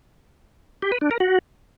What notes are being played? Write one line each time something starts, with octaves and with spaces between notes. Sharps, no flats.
G4
B4
D4
A#4
F#4